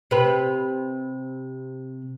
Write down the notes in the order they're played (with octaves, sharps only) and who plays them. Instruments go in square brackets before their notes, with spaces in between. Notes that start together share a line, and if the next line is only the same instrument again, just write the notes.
[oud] C3 B4